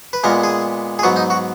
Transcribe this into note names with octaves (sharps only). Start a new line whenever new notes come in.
B4
A#2 G#3 B3 A#4
G#4
G#4
G#2 F#3 B3 F#4
D#4
F#4